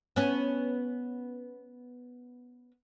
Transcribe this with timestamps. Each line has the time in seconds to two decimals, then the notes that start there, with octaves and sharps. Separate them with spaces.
0.16 B3 C#4